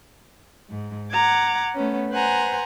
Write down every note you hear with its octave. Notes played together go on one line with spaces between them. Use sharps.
G#2
F#5 A#5 D6 G#6
A3 B3 C#4
B4 C5 F#5 G#5 A#5